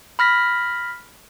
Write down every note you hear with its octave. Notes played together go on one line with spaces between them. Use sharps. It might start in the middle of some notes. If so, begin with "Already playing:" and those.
B5 F6 A#6 B6